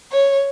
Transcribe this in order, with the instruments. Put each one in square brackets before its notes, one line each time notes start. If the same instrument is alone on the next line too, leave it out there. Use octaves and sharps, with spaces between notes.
[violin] C#5